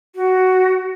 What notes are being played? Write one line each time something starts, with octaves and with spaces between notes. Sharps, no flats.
F#4